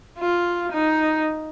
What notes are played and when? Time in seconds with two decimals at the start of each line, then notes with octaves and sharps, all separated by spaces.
0.18 F4
0.72 D#4